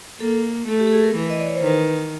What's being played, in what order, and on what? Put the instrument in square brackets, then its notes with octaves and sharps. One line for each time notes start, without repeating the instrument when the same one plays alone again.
[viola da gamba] A#3 [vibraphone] A4
[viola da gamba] A3 [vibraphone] A4
[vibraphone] G4
A4
G#4
A#4
[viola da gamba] E3
[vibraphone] D#5
D5
C#5
C5
[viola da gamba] D#3 [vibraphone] B4